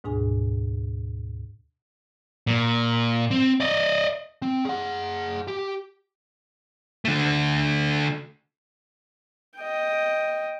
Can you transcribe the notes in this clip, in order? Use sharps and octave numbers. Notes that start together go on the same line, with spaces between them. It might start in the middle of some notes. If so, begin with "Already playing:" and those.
D2 G#2 B2 D4 G#4 G#5
A#2
C4
D5 D#5
C4
G#4 F#5
G4
D3 A3
D#5 G5